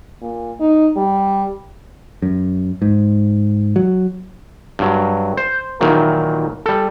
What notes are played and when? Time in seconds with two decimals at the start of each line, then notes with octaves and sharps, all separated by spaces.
0.22 A#2
0.60 D#4
0.96 G3
2.22 F#2
2.82 G#2
3.76 F#3
4.79 G2 F#3
5.37 C5
5.81 A#2 D#3 E3 F#3
6.66 G3 A4